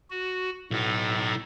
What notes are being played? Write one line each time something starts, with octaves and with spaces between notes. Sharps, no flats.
F#4
B1 A2 D#4